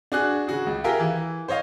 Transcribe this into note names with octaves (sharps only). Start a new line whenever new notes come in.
D4 F#4 G#4 F#6
C#3 F#4 G#4
C#2
F4 G4 G#4 A#4 E5 G5
E3
C5 C#5 D#5 F5